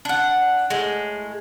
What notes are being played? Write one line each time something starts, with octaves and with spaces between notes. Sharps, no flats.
D4 F#5
A2 G#3